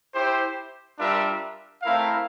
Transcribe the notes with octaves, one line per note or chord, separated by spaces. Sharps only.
E4 G4 C5
G3 D4 F4 A#4 E5
A3 C4 E4 A#4 F5